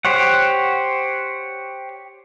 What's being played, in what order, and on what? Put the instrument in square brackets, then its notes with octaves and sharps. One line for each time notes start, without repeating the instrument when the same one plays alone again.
[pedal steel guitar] G4 C5 C#5 F#5